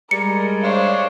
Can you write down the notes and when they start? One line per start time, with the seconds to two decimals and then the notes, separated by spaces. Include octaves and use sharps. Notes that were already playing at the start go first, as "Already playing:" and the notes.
0.11 G3 G#3 A#4 C#7
0.63 D4 C5 C#5 F5